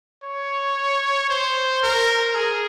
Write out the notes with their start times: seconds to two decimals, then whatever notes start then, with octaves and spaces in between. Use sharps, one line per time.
0.23 C#5
1.30 C5
1.83 A#4
2.35 G#4